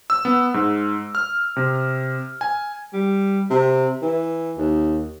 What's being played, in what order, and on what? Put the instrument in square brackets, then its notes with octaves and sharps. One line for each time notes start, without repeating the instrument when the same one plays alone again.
[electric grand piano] E6
B3
G#2
F6
C3
G#5
[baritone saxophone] G3
C3
E3
D#2